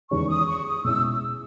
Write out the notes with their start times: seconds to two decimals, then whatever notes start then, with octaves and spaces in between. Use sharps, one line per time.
0.10 E2 D#3 G#3 C#4 C#6
0.30 D#6
0.48 C#6
0.67 D#6
0.84 B2 G#3 C#4 E4 E6